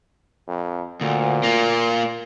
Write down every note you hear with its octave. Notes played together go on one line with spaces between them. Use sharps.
F2
D2 A#2
A#3 F4